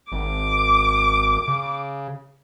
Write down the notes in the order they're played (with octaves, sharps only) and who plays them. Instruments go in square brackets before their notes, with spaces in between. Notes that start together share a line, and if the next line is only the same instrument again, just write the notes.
[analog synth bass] G#1 [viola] D6
[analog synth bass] C#3